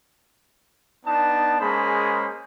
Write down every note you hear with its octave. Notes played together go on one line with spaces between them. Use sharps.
B3 D4 D#4 A5
G#3 A#3 C#4 G#4 C5 B5